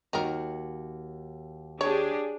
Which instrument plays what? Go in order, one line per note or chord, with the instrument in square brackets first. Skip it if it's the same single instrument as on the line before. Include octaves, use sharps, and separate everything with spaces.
[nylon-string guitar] D#2 F#4 [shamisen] D#4 A#4
[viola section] D4 G4 G#4 [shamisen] C#5